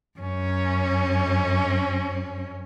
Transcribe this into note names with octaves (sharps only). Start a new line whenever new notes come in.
F#2 C#4